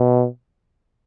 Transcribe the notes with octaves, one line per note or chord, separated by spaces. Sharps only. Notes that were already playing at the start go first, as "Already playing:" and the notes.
Already playing: B2